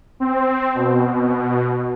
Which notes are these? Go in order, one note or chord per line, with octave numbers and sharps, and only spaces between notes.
C4
B2